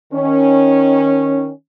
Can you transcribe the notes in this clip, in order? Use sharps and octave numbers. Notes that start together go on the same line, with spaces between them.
D#3 C#4